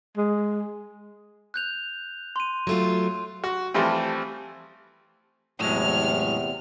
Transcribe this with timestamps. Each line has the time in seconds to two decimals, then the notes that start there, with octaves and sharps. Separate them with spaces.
0.17 G#3
1.54 F#6 G6 F7
2.36 C6 D#7
2.67 F#3 A3 F4
3.44 F#4
3.74 E3 F3 G3 A3 C4
5.60 E2 A2 C3 F#3 G#3 F6